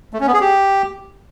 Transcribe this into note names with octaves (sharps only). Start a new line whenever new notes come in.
A3
C#4
B3
G#4
G4